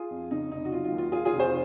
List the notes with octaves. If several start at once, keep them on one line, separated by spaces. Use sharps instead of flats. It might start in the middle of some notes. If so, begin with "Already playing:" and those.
Already playing: F4 G#4
F2
C#3 D#4
F1 D#4
F#4
F#3 F4
F4
D#2
F4
D#3 F4 G#4
F4 G#4
F1
G#4 C5